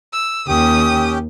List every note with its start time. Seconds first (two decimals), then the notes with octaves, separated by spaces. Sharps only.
0.13 E6
0.48 D#2 C#4 G4 G5 D#6